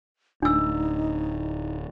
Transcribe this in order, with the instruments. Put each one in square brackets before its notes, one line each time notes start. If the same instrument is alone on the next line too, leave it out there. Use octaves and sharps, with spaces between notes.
[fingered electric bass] D1 [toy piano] D4 E6 [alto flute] D#4